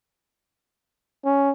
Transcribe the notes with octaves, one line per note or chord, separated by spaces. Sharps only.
C#4